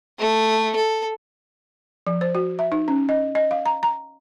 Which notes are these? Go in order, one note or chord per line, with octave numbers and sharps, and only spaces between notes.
A3
A4
F3
C5
F#4
E5
D#4
C#4
D#5
D#5
F5
A#5
A#5